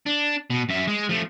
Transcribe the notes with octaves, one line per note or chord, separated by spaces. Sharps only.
D4
B2
F#2 E5
G#3
F3 A3